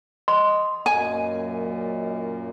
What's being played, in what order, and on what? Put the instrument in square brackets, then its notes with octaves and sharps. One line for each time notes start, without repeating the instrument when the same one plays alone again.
[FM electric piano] D#5 [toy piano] C6
[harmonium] F#2 A#2 [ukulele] G#5